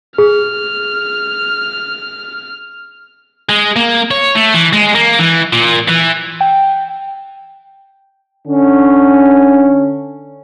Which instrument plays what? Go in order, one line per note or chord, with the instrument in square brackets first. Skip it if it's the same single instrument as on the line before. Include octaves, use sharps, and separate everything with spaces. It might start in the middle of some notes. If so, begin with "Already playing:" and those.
[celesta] G#4 [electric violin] F6
[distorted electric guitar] G#3
A#3
C#5
A3
E3
G#3
A#3
E3
A#2
E3
[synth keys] G5
[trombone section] D3 C#4